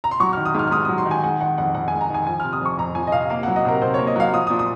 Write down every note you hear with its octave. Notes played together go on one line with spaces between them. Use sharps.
A#5
C6
F#3 C#6
F6
D#3
D#6
G#2 F6
F6
G#2 D#6
F#3 D#6
C6
D#3
G#5
G#3 F#5
D#3 F#5
F2 F#5
F2 F#5
G#5
G#3
A#5
D#3 G#5
F3 G#5
F6
C3
D#6
F2 C#6
F2 A#5
F3 G#5
D#5
C3 F5
A#3 F5
F#5
F#3
D#5
C3 A#4
C3 C5
C#5
A#3
D#5
F#3 F5
F3 D#6
A#2 D#6
D#6